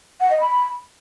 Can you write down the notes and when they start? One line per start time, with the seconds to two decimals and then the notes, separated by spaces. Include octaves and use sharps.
0.21 F#5
0.31 D#5
0.41 B5